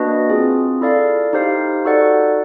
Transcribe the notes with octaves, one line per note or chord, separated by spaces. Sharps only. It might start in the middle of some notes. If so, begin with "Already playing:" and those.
Already playing: A#3 D4 F#4 B4 D#5
C4 F4 G#4
E4 A4 D5 F5
D#4 G4 C5 F5
D#4 F#4 A4 D5 F#5